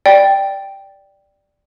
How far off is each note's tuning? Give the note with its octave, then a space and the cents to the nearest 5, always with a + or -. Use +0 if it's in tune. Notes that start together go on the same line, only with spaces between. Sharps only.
D5 +0 G5 +0